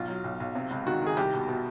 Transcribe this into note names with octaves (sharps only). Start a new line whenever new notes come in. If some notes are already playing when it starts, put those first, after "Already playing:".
Already playing: B1 F4
F#3
B1
B1
C3
C#2
D#3 F#4
D#3 G#4
C2 G4
B2
B2